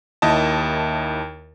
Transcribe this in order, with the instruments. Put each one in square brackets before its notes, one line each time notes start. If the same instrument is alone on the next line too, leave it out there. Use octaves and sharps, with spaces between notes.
[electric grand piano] D#2 E4 D#5 A5